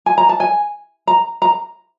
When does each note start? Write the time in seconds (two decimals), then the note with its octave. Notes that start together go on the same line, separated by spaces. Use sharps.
0.06 G#5
0.18 A#5
0.29 A5
0.40 G#5
1.07 A#5
1.42 A#5